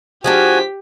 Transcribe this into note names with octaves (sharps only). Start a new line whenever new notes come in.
F3 G#3 D4 F#4 G4 G#5 B6